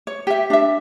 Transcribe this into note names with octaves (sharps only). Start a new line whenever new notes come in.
C#5
G4 E5
D4 E5